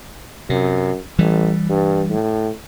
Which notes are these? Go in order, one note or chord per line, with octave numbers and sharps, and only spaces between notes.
F#2 C3
A1 E3 G3
G2
A2